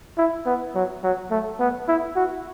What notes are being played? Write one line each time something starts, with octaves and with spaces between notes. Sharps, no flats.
E4
B3
F#3
F#3
A3
B3
E4
F#4